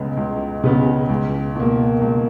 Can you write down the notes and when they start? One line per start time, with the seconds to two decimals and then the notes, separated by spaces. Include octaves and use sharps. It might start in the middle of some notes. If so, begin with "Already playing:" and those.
Already playing: C#2 C#3 G#3 B3
0.17 C#2
0.63 C#3 G#3 B3
1.09 C#2
1.55 B2 A#3
2.01 C#2